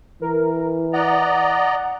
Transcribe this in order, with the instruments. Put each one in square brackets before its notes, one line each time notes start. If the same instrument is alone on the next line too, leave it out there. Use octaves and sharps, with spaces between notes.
[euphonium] E3 [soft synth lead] A#4
[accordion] D5 D#5 A#5 [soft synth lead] F#5